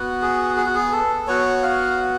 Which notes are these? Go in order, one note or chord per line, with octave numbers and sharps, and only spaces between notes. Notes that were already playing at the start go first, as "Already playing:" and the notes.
Already playing: B3 F#4
G#4
G#4
F#4
G#4
A4
B3 F#4 C#5
F5